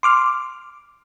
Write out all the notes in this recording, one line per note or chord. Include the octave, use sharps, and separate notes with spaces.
C6 D6 F6